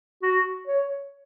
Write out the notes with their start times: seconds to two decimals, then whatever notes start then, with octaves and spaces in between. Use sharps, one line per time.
0.22 F#4
0.67 C#5